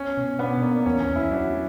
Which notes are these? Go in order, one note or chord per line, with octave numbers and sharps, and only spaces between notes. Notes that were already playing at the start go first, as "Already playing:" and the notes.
Already playing: C#4
B2
B3 D4
A#3
E2 C#4
C#4
E2
E4
F#3 D4